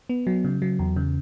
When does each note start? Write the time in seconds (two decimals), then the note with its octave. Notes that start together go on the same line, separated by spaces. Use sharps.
0.09 B3
0.27 F#3
0.44 C#3
0.62 F#3
0.79 E2
0.96 C#3